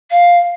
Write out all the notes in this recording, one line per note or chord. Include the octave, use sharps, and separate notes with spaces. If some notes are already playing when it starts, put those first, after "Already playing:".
F5